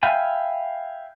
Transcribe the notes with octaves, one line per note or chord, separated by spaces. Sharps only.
E5 F5 G5 G#5 B5